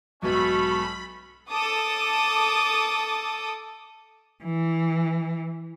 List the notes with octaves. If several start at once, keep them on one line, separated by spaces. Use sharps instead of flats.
B1 G#2 A3 B3 C#4 F#4 B5
A4 D6 D#6
E3